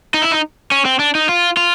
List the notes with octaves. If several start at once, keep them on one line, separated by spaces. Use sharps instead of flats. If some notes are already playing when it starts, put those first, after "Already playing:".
D#4
E4
D#4
C#4
C4
D4
D#4
F4
F4